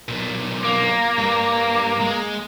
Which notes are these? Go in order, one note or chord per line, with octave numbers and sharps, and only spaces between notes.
B1 A#2
A#3
G2
G#3